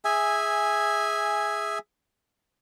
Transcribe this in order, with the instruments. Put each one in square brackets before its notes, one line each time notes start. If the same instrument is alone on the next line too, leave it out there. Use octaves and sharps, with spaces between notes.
[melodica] G#4 E5 G#5